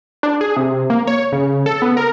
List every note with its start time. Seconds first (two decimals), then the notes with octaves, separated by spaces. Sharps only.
0.23 D4
0.41 G#4
0.56 C3
0.90 A#3
1.07 C#5
1.32 C#3
1.66 A4
1.82 B3
1.97 A#4